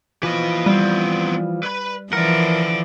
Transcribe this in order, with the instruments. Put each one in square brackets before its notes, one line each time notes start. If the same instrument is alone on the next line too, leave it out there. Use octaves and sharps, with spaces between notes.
[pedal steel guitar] E3 F3 [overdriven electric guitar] B4 D#5
[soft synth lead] G3 [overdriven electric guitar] B3 C4
[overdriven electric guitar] B4 B5
[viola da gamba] E3 F3 [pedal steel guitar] A#4 [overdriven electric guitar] D5 F#5